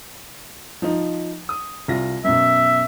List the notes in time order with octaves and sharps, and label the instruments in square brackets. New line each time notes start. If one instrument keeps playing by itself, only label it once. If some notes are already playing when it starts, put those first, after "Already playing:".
[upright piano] F3 D#4
D#6
C2 F4 A#6
[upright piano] F#2 B2 [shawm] E5